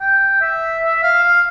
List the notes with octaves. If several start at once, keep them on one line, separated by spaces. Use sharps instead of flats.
G5
E5
E5
F5
F5